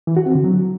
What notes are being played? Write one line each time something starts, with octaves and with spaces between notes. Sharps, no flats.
E3
F#4
C4
D3
F#3